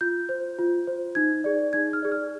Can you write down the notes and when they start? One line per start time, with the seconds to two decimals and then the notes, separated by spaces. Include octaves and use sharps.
0.01 F4 G6
0.29 C5
0.59 F4
0.87 C5
1.15 D#4 G#6
1.44 G#4 D5
1.73 D#4 G#6
1.93 F6
2.02 G#4 D5
2.12 F6